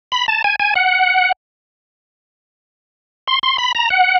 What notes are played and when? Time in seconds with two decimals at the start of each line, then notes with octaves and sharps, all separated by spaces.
0.12 B5
0.28 A5
0.44 G#5
0.60 G#5
0.76 F#5
3.27 C6
3.43 C6
3.58 B5
3.75 A#5
3.90 F#5